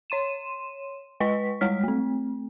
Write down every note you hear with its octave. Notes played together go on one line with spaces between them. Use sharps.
C#5 C6 D#7 E7
G#3 B4 D#5 C#6 B6
G3 G#3 C#5 F6 B6
A3 C4